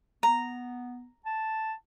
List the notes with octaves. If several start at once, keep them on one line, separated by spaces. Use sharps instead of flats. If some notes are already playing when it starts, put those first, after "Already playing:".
B3 A#5
A5